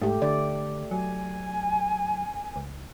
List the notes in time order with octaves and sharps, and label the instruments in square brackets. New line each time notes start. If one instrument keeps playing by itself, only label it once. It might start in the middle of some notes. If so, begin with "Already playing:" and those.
[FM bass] G#2 [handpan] A3 G4
[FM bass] D3 [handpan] D5
[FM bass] F#3 [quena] G#5
[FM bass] C#2